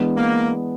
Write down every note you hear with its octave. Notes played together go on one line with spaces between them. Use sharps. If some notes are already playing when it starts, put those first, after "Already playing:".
Already playing: E3 G#3 B3 D4
A#3